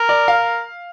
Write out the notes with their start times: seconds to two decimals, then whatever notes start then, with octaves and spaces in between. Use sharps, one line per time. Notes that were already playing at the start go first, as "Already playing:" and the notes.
Already playing: A#4
0.09 D5
0.28 F5